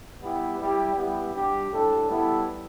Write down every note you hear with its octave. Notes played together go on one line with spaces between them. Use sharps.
G3 B3 E4 G4
G3 E4 G4
G3 B3 E4 G4
G3 D4 G4
A2 G3 D4 A4
G3 B3 E4 A4